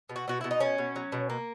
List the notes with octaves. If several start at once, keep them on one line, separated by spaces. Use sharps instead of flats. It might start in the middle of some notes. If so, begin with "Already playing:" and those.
B2
F#4
B2 F#4
B2 E4
D#4
B2 C#4
B2
F#3
B2
A#3